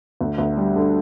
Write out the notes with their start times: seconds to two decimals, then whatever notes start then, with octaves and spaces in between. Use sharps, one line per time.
0.21 D2
0.38 D2
0.57 G3
0.76 D3